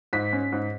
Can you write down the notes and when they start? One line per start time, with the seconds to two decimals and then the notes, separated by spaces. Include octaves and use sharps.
0.13 G#2 B6
0.33 C#4
0.52 G#2